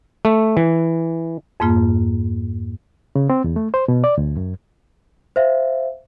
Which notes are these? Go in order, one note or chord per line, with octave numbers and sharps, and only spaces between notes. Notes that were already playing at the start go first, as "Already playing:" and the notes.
A3
E3
F2 G#2 A#3 F4
C#3
C4
E2
A3
C5
B2
D5
D2
F#2
C5 E5 F5